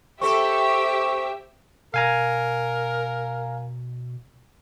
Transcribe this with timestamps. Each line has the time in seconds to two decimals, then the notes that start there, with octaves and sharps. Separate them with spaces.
0.21 C4 G4 A4 E5 C#6
1.94 B2 A#4 F5 G#5 A#5